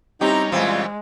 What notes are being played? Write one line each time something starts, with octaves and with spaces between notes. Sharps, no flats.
G3 C4 C#4 D#4 E4 G4 A#5
A#2 E3 G#3 C4 F4